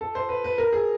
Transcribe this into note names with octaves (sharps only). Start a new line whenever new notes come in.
A4
C5
B4
B4
A#4
G#4